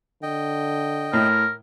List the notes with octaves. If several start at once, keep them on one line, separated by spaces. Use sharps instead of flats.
D3 D#5 G5
A2 A#4